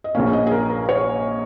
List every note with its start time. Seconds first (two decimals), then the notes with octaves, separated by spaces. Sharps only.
0.04 D#5
0.15 A#1 A#2 A#3 C#4 F5
0.33 D#5
0.47 G#4
0.52 A#4
0.70 A#4
0.89 C#5